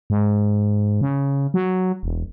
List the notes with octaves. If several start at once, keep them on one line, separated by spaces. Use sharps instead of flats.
G#2
C#3
F#3
E1